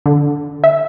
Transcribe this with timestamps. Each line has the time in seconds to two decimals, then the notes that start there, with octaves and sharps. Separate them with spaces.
0.06 D3
0.64 E5